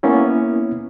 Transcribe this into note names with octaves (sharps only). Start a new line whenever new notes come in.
A#3 B3 C#4 E4